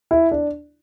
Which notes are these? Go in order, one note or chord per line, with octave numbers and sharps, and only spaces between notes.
E4
D4